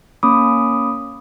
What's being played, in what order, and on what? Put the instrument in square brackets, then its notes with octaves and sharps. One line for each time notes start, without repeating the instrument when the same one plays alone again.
[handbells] A#3 C#4 B5 D6 D#6